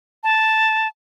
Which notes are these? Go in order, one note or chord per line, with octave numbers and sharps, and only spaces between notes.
A5